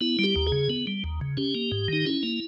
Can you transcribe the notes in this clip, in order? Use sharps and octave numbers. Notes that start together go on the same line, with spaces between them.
B3 E4
G3 G4
D#2
G#4
C#3
B3
G3
D#2
C#3
C#4 G4
A#3
G#2
D#3 D#4
C#4 E4
A#3